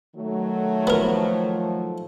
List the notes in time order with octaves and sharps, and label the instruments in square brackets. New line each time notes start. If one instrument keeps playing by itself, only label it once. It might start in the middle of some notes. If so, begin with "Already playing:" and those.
[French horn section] D#3 F#3 A3
[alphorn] F3 [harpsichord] B3 A#4